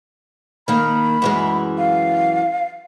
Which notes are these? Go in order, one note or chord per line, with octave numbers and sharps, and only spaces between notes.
D#3 A#3 B5
F#2 E3 G#3
F5